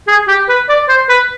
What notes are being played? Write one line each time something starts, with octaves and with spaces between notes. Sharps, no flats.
G#4
G4
B4
D5
C5
B4